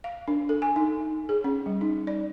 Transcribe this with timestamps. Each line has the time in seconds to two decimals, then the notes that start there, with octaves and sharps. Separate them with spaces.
0.04 F5
0.28 D4
0.49 A4
0.62 G#5
0.76 D#4
1.29 G#4
1.44 C#4
1.66 G3
1.81 D#4
2.07 D5